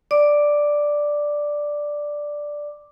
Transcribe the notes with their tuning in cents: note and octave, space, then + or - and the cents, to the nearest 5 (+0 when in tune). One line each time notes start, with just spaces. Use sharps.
D5 +0 D6 +0